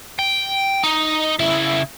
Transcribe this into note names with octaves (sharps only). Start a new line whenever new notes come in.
G5
D#4
C#3 E4